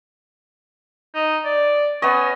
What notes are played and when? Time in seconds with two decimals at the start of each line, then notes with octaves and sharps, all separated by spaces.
1.15 D#4
1.45 D5
2.02 B3 C#4 D#5